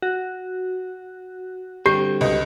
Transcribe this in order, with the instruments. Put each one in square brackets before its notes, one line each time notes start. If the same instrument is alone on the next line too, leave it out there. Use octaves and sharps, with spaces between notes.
[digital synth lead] F#4
[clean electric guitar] D3 G3 C4 [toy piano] G4 [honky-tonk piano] G6
[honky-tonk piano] C#2 D#5